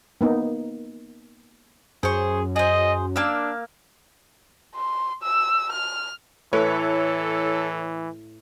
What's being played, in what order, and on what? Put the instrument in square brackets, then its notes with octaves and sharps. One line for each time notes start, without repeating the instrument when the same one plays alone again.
[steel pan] A#3 B3 D#4
[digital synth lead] F#2 [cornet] G#4 [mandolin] C5 C#6
[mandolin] G#4 C5 [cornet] D#5
[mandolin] A#3 F5 E6 [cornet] D4
[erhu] C6
E6
F6
[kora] A2 B4 [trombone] E3 [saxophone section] A4 [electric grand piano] C#5